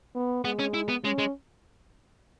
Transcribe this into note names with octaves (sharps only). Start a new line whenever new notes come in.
B3
G#3 B3
C#4
E4
B3
G#3 C#4
G#3